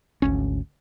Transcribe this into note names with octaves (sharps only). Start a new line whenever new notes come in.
G#1 D2 C#4